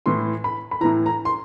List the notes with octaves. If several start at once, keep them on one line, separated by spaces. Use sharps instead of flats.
A2 E3 C6
B5
B5
A2 E3 A#5
A#5
C6